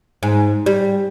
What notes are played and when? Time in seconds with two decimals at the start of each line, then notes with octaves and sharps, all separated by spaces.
0.23 G#2
0.66 G3